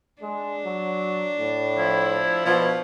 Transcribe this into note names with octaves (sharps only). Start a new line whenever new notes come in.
G#3 D4
F#3
A2
F3 E4
B2 F3